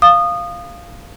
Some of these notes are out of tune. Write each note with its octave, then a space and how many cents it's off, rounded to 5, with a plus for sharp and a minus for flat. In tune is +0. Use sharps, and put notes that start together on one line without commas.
F5 -5 D#6 -20